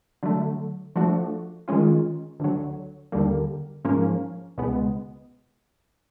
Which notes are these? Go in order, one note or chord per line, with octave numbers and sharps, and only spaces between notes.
D3 F#3 A3
F3 A3 D4 F#4
D#3 G#3 C#4 F4
D2 D3 F#3
D#2 D3 G3 A#3
G#2 F3 A#3 C#4
C#2 B2 G#3 B3